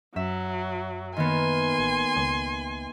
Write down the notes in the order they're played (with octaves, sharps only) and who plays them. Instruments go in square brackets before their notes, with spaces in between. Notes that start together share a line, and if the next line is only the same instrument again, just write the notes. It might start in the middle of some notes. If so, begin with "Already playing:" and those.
[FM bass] F#2 [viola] F#3 [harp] E5
[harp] D#3 A#3 B3 [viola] G#5 C6
[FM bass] A1
C#2